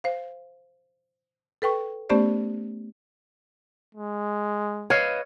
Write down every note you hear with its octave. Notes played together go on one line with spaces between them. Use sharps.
C5 F5
A4 B4 G5 C#6
A3 B3 C#4 G4 C5 D5
G#3
B4 C#5 D#5 F5